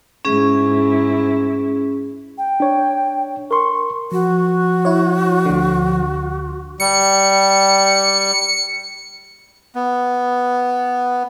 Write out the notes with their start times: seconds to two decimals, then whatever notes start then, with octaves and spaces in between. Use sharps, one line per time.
0.25 G#2 C#4 E4 G#4
2.38 G5
2.60 D4 C#5
3.51 A#4 C6 C#6
4.12 F3 F#4
4.85 E4 C#5
5.46 D2 D3
6.80 G3 C#7
9.75 B3